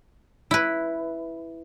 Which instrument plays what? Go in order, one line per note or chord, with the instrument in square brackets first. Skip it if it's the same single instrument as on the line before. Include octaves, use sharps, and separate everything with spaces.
[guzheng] E4 B4